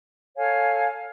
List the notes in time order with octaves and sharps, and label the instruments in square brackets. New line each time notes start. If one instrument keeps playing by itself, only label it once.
[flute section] A4 C#5 F5 G#5